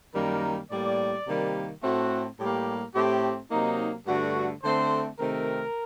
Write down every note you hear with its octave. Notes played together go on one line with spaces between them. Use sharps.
F#2 D#3 G3 A#3 A#4
A2 G3 A#3 D5
C3 D#3 G3 A#3
A2 A3 C4 F#4
A2 G3 A#3 G4
A2 A3 C4 G4
C3 F#3 A#3 D#4
G2 D3 A3 F#4
D3 A3 C4 C5
C3 D#3 A3 C4 A#4